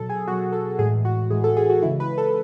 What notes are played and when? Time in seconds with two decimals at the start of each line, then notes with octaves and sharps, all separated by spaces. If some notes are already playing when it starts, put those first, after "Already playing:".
Already playing: B2 F#3 A4
0.10 G#4
0.27 B2 F#4
0.31 F#3
0.52 A4
0.79 A2 E3 G#3 G#4
1.05 F#4
1.30 A2 E3 G#3 G#4
1.44 A4
1.57 G#4
1.70 F#4
1.83 C#3 E3 G#3 E4
2.00 B4
2.18 A4